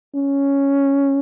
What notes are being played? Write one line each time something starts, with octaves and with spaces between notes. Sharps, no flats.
C#4